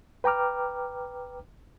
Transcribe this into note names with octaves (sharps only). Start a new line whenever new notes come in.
B4 G5 A#5 D6 F6